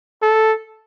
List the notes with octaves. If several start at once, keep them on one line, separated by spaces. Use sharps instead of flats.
A4